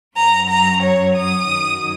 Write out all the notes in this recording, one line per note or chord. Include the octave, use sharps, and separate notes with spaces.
F#2 F#3 A#5
A#5
C#5
D#6
F#2 D#3 F#3